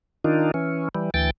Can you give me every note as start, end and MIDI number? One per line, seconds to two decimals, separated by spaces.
0.24 0.51 51
0.24 0.51 62
0.24 0.51 63
0.24 0.51 65
0.54 0.89 52
0.54 0.89 61
0.95 1.10 52
0.95 1.10 55
1.14 1.30 38
1.14 1.30 52
1.14 1.30 79
1.14 1.30 93